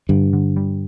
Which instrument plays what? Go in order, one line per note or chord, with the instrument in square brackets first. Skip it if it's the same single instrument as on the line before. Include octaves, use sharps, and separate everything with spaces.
[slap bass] G2 [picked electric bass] D3
[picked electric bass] D3
G3